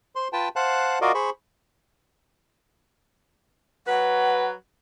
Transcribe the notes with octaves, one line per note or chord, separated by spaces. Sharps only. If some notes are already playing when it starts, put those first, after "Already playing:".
C5 C6
F4 B4 G5 A5
C5 F5 F#5 A5 F#6
F4 F#4 A#4 D5 D#5 F5
G#4 C5 B5 C#6
F#3 B4 F#5